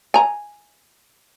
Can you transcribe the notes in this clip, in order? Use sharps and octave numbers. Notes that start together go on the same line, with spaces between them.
G#5 A#5